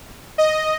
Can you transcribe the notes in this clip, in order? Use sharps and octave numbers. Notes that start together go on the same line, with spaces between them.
D#5